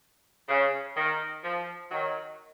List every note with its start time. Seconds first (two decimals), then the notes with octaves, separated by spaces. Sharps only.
0.49 C#3
0.96 D#3
1.44 F3
1.91 D#3 F#3